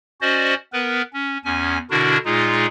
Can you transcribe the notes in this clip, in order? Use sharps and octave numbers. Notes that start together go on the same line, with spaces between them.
C#4 F#4 C5 D5 D#5
B3 A#4 B4
C#4
E2 C#4 G#5
B2 D3 D4 E4 F#4 A#4
A#2 G#3 D#4 F4 G#4